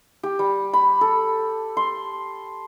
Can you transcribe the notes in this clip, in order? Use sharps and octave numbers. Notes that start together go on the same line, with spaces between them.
G4
G3
B5
A4
C6